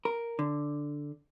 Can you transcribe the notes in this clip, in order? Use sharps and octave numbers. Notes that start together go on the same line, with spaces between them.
A#4
D3